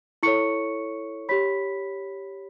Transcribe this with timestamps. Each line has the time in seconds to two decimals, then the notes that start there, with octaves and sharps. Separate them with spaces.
0.23 E4 A4 C#5 C#6 C#7
1.29 G4 C#5 B5 B6